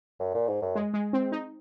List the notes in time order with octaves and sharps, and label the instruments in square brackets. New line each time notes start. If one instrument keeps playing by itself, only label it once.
[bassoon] F#2
A#2
G#2
F#2
[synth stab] G#3
G#3
C4
D#4